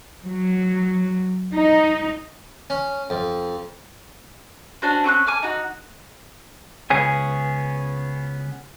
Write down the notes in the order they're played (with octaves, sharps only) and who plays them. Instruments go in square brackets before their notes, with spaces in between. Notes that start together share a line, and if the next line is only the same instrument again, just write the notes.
[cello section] F#3
D#4
[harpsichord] C#4
F2
[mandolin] C#4 D4 F#4 C5
C4 C#4 C#6 F#6
G#5 D6 F6
D#4 F#4
[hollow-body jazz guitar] C#2 G#5 [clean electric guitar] B3 C#4 G#4